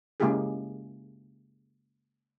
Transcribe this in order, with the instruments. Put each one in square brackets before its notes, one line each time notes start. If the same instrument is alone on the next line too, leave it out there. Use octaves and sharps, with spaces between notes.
[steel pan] C#3 G#3 A#3 E4 G4 G#4